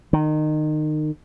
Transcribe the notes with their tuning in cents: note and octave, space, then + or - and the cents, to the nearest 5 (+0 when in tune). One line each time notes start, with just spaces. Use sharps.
D#3 -25